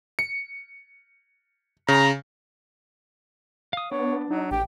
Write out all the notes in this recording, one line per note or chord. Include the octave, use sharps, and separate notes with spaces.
C#7
C#3 A#5
F5 D#6
B3 D4 C#5
F#3 D#4
A1 G4 G5